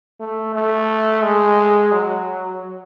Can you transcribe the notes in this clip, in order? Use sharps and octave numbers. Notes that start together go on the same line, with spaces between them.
A3
A3
G#3
F#3